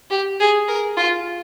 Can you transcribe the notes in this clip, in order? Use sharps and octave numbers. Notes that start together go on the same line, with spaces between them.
G4
G#4
A#4
F4